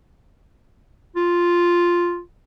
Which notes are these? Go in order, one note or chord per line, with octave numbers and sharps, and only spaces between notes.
F4